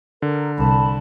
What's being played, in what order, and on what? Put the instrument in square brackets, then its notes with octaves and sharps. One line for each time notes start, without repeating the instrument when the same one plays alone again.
[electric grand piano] D3 [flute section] A#4
[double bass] C2 [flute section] A5 B5